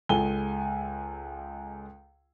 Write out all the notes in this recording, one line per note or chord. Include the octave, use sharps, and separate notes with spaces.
C#2 G#3 A4 G#5 G7